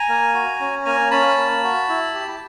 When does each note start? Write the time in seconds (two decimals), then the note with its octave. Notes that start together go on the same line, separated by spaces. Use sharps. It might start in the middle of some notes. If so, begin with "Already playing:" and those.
Already playing: G#5 A#5
0.09 A#3
0.34 F#4
0.60 C#4
0.85 A#3 G#5 A#5
1.11 C#4 A5 B5
1.37 A#3
1.63 F#4
1.89 E4
2.14 G4